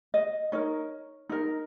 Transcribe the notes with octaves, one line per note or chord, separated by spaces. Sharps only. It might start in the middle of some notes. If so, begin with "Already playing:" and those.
D#5
D#4 A#4 C#5
D#4 A#4